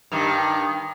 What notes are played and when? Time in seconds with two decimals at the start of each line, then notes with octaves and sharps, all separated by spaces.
0.12 G2 D#3